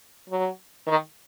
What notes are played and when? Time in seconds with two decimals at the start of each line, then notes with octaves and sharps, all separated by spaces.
0.30 F#3
0.87 D#3